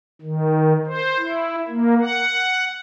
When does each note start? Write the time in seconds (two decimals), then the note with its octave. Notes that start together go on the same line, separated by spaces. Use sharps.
0.22 D#3
0.86 C5
1.18 E4
1.68 A#3
2.00 F#5